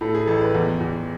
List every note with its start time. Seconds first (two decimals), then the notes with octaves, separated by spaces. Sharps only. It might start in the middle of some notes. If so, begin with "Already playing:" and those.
0.01 A2 A4
0.15 G#4
0.27 A1 A4
0.41 B4
0.55 E2
0.81 E2